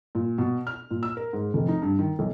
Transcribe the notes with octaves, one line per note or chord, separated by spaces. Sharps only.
A#2
B2
F6
A#2
E6
A#4
G#2
F1
D#4
G2
D#3
B1